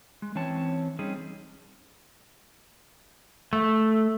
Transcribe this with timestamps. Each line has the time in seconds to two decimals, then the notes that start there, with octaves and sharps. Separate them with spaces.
0.22 G#3
0.35 E3 C4 C#4 C#5 A5
0.99 G3 C4 C#4 D#4 G#4
3.53 A3